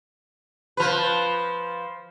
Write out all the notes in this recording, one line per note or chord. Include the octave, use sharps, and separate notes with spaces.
F3 B4